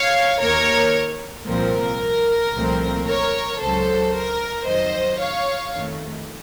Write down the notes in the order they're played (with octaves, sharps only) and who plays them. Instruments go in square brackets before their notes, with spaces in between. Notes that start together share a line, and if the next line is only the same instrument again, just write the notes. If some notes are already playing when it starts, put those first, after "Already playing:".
Already playing: [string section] C#5 F5
D#2 D#3 A#3 A#4 C#5
C2 A#2 F3 C4 A#4
C2 A#2 F3 A3 C4
A#4 C#5
C#2 C#3 F#3 A4 C5
A#4
F2 D#3 F#3 C5 D#5
C#5 F5
F2 D#3 A3